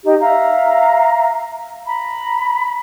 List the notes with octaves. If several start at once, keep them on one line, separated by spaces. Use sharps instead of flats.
D#4 G4
E5 F5 A#5
A#5 B5